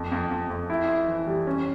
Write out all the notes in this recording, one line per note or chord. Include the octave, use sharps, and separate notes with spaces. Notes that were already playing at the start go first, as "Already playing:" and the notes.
Already playing: F2
F2
F2
F2
E4
E4
E3
G3
C#4